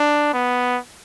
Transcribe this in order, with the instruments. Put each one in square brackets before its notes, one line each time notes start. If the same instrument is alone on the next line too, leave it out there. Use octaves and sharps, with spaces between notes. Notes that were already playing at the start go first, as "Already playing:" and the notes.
Already playing: [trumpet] D4
B3